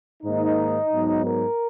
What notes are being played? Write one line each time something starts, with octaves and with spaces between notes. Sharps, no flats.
G#2 D#3 A#3 D#4
G#2 F#3 B3
A#4